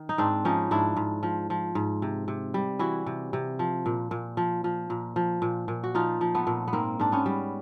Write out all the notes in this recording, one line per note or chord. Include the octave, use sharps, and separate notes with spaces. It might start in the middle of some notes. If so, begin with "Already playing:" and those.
Already playing: D#3
D#4
G#2 C4 D4
F3 C#4 D#4
G#2 D4 E4
G#2
F3
F3
G#2
C3
C3
G3
E3 E4 F#4
C3
C3
F3
A#2
A#2
F3
F3
A#2
F3
A#2
A#2
F#4
F3 D#4 F4
F3
A3 B3
A#2
B3
G#2 A#3 C4
G#2 D4
B3 C#4
G3